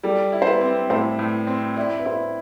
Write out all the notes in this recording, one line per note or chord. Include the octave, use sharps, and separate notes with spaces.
G3 A4
E4
C5
B4
C4
A2 C5
A2
C4
E4 D5
B4
E4 C5